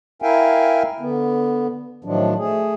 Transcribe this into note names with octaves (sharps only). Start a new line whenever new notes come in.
E4 A#4 E5 F5 G5 G#5
D3 B3
A2 D#3 F3 F#3 D4
A3 G#4